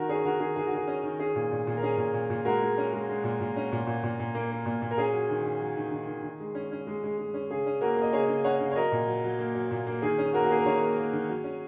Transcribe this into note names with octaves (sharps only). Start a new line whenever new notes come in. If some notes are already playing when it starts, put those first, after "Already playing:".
Already playing: D#3 F#4 A#4
C#4 G#4 C#5
D#3 F#4 A#4
D#3 G#4
D#3 G#4
F#4
D#3 G#4
C#4
D#3
C#4 G#4
A#2
A#2
A#2
A#4
C#4 G#4
A#2
A#2
A#2
G#3 F#4 A#4
G#3
C#4
G#3
G#3
A#2
A#2
C#4
A#2
A#2
A#2
A#2
A#3
A#3
A#2
A#2
A#4
C#4 G#4
F#3
D#3
C#4
F#3
D#3
D#3
D#3
D#3
G#3
C#4
C#4
G#3
G#3
G#3
C#4
C#3 G#4
C#4
A#3 F#4 A#4
A#3 D#5
C#3 G#4 C#5
C#3
C#4 C#5 F#5
C#3
C#5
F#3 A#4 D#5
A#2
F#3
F#3
A#3
F#3
A#2
A#3
D#3 G#4
C#4
A#3 F#4 A#4
F#4
A#3 G#4
A#4
D#3 G#4 C#5
A#3
A#3
D#3
F#3
C#4